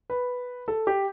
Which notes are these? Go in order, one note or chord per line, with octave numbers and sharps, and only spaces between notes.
B4
A4
G4